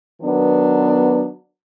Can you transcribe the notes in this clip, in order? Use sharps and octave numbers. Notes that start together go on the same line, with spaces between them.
D#3 F#3 B3 D4